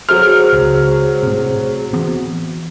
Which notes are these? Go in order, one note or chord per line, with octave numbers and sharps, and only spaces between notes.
F#3 G#4 C5 F6
C#2
A2 C3
E3 B3 C4